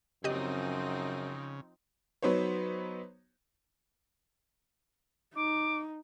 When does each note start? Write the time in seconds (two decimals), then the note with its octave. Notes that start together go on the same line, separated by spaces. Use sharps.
0.24 F#2 C#3 F3 C4 D#4 G4 D#5
2.22 F#3 B3 D#4 C5 C#5
5.35 D#4 D6